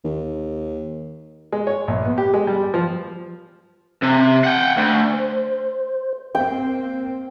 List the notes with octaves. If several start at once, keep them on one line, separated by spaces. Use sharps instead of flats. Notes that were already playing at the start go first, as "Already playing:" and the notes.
D#2
G#3
C#5
A#1
B3
G4
G#3
G3
F3
C3
F#5 G5
D2
C5
A#3 C4 G5